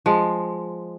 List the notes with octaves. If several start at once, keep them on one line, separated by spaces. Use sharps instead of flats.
F3 G#3